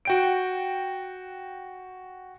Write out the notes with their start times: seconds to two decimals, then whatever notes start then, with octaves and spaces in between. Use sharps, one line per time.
0.05 F#4 G5 D7